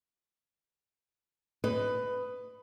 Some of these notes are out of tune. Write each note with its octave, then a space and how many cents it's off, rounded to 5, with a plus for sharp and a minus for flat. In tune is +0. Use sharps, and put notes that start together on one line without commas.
B4 +15 D#5 +0